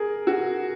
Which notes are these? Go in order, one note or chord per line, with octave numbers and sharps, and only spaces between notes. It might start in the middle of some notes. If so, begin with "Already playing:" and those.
Already playing: G#4 A#4
F#4